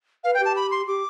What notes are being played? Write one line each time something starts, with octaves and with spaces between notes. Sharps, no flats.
B4 F5
G5
G4
A5
B5
C6
G4 D6